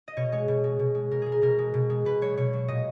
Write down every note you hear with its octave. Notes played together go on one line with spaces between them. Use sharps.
D#5
B2 C#5
G#3 C#5
B2
G#3
B2
G#3
B2 A#4
G#3 G#4
A#4
B2 A#4
G#3
B2
G#3
B2 B4
F#3 C#5
B2 C#5
F#3
A#2 D#5